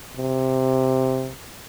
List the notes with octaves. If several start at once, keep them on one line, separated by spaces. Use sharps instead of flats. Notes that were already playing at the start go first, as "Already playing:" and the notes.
C3